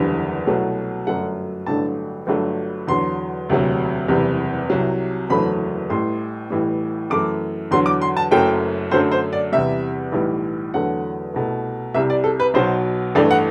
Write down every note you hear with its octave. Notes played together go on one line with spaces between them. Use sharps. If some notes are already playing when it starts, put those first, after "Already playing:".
Already playing: F#1 E2 D3 G3
C2 B2 F#3 A3
G1 F#2 F#3 A3 F#5
A1 G2 D3 F#3 A3 A5
G1 G2 F#3 A3
E2 D3 F#3 C6
E1 D2 C3 F#3
F#1 E2 C3 G3
C2 C3 F#3
F#1 E2 D3 F#3 A3 B5
A1 A2 G3 C6
A1 A2 E3 G3
F#2 E3 A3 D6
E2 D3 F#3 C6
D6
C6
A5
F#1 F#2 F#3 A3 G5
F#2 D3 F#3 A3 C5
C5
D5
E2 C3 G3 E5
B1 A2 E3 G3
E2 D3 F#3 A3 F#5
C2 B2 A3
C2 C3 G3 E5
D5
A4
B4
B1 B2 F#3 C5
A1 G2 E3 A3 D5
F#5